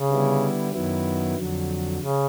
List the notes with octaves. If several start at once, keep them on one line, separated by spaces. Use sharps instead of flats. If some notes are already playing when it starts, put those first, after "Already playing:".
Already playing: C#3
D3 G3 B3 E4
F#2 D#3 F#3 B3 E4
F2 D3 F#3
C#3